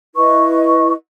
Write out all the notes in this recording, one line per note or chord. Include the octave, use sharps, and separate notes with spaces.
E4 B4 D#5 C#6